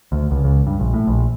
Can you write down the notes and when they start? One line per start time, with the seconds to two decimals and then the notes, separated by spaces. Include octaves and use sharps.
0.12 D2
0.31 C#2
0.44 C#2
0.67 G2
0.80 A#1
0.94 A2
1.07 A#1